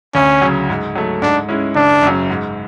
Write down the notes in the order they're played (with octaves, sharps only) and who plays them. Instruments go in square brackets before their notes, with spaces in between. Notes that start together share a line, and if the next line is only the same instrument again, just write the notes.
[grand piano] D2 [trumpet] C#4
[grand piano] C#3 F#3
G#2
F#3 A3
[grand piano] G#2 [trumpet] D4
[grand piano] G#3 C#4 E4
[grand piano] F#1 [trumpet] D4
[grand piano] F#2 C#3 F#3
G#2